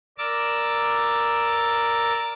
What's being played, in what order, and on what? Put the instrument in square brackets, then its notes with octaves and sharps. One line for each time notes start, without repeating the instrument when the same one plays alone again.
[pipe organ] A#4 D5 D6 E6